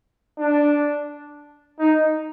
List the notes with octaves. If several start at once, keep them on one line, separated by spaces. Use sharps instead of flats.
D4
D#4